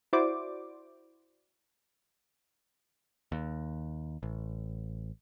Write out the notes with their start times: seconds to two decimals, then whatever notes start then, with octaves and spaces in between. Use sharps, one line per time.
0.13 E4 F#4 C5 D5 D6
3.32 D#2
4.23 A1